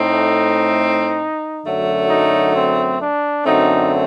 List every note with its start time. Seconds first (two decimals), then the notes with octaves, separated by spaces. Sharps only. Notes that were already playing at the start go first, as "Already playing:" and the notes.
Already playing: A2 A3 C4 D#4
1.65 F#2 D3 F#3 A3
2.10 D#4
2.55 C4
3.00 D4
3.45 F#2 D3 F#3 A3 C4 D#4